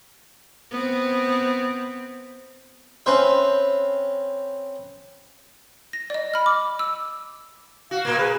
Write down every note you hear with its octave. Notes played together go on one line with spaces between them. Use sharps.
B3 C4
C4 C#4 B4 C5 E5
A#6
D5 D#5
B5 F6
D6
E6
F#4 F5
A#2 A#3
G#4 B4